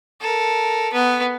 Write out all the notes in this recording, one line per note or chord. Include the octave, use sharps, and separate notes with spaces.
A4 A#4
B3 B4